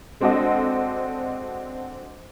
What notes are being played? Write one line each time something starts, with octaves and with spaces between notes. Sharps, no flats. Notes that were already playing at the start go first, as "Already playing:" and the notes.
G#3 C4 D4 F#4 A4 D#5